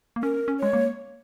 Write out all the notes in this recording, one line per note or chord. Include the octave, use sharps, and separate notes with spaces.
A#3
C#4 A#4
C#4
G#3 C#5
A#3